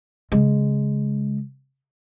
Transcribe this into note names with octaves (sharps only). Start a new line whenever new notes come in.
C#3 G#3